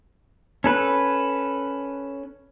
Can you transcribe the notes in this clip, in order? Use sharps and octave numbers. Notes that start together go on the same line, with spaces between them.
C#4 A4 B4